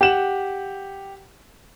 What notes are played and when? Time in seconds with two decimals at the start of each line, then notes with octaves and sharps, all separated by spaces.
0.01 G4 F#5 E7 F#7